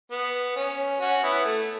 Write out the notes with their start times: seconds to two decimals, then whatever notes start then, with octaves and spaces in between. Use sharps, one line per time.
0.12 B3
0.56 C#4
1.01 C#4 F#4
1.23 B3 E4
1.45 A3